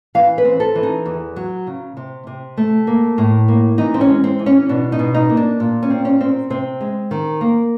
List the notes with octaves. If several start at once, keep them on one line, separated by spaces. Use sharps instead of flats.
E3 F5
B4
C4
A4
E3
D#4
E2
F#3
C#3
C3
C3
A3
A#3
A2
A#3
E3 D#4
C4
C#4
G#3
C4
E3
C#4
B2 D4
D#4
B2
D#4
A#3
D4
A#2
C#4
C4
C#4
C4
C3 C4
G#3
D#3
A#3